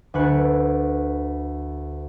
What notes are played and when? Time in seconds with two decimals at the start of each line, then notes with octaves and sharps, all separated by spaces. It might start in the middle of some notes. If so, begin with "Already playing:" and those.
0.14 D2 A4 B4 G#5 F#6 C#7